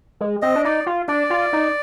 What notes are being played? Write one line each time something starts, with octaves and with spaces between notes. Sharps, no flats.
G#3
C4 D#5
D4
D#4 D5
F4
D4 D5
F4
D#4